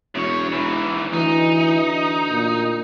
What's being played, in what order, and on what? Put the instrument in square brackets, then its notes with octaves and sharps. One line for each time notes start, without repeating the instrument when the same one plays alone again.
[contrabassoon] E1 [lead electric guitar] F#2 C#5
[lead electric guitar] G#2 E3
[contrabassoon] D2 [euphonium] E3 [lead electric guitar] D#4
[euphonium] A#2